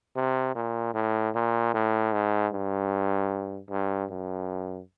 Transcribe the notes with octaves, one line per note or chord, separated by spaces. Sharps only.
C3
A#2
A2
A#2
A2
G#2
G2
G2
F#2